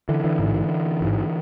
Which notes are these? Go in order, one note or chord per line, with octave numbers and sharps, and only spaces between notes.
D3 E3
D3 E3
A1 G#2
A1 G#2